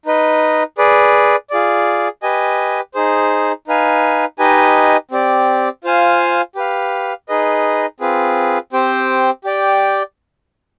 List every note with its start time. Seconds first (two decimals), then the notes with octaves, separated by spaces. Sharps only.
0.06 D#4 B4 D#5
0.78 G#4 B4 D5
1.50 F4 G#4 D5
2.23 G4 B4 D#5 G#5
2.94 D#4 G#4 C5
3.67 D#4 B4 F5 G#5
4.39 D#4 G4 B4 D#5 G#5
5.11 C4 G4 D5
5.84 F4 C5 F5 G#5
6.55 G4 B4 F5
7.29 D#4 G#4 B4 D#5
8.00 C4 F4 G#4 B4
8.73 C4 G4 C5 G5
9.44 G4 D5 G5